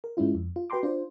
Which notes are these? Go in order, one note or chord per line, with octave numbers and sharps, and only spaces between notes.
A#4
G#2 G#3 C#4 E4 F4
F2
F4
F#4 B4 G5 A#5 C6 D6
D4 F4 C5